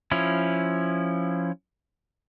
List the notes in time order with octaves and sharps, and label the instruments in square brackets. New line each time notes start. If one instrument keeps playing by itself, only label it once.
[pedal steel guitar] F3 C#4 E4